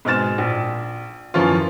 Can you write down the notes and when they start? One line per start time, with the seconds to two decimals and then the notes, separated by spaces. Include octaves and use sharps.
0.05 G#2 B2 C4 F6 A6 E7
0.38 A#1
1.34 F#2 E3 F3 C#4 F4